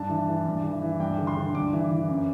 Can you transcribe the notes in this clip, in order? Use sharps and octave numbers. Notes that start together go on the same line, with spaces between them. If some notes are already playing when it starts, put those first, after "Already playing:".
Already playing: G2 A5
E3
E3
G2
E3
E3
G2 G5
D3
C6
D3
G2 D6
E3
E3
F#2